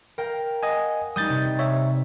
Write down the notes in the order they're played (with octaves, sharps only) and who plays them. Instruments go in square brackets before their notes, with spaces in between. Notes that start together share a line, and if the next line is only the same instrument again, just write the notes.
[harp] A#4 F5 G5
[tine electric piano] D#5 F#5 G#5
[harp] G3 D#4 [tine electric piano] D#6 G6 A6
[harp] C3
[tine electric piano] C#5 E5